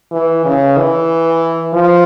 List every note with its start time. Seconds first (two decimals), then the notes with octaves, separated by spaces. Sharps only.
0.12 E3
0.45 C#3
0.77 E3
1.74 F3